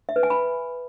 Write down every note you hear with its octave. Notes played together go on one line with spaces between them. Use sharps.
E5
B4
G#5
B5